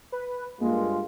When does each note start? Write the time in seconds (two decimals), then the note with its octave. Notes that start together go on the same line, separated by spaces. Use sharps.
0.12 B4
0.61 G2 G#3 A#3 F4